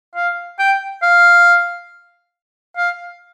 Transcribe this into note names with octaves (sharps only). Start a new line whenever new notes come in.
F5
G5
F5
F5